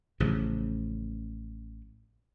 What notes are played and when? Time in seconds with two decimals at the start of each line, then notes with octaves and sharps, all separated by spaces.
0.20 A1 C#3 F3